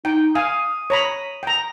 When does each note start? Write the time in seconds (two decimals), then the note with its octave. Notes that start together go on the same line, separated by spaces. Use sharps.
0.05 D#4 G5
0.35 F5 G#5 D#6
0.90 C#5 A#5 B5
1.43 G5 A#5